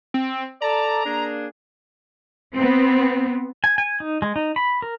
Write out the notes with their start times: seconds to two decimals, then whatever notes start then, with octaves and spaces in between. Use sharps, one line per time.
0.14 C4
0.62 A4 D5 A5 A#5
1.05 A#3 D4 G#4
2.55 B3 C4
3.64 G#5
3.78 G#5
4.00 D#4
4.22 G#3
4.36 D#4
4.56 B5
4.82 A#4